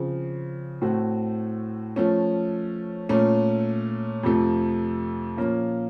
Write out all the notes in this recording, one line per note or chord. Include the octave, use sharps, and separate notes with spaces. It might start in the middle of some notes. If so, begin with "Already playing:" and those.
Already playing: C#3 F3 C4
A2 A3 C4 F#4
F3 A3 C#4
A#2 A3 C#4
F2 C3 F3 A3
A#2 F3 A#3 C#4 F4